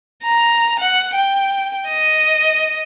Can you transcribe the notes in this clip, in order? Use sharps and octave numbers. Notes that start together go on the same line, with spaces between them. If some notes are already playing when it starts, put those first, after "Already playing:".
A#5
F#5
G5
D#5